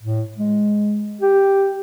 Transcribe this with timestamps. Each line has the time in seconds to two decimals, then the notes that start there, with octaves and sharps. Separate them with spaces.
0.03 A2
0.38 G#3
1.21 G4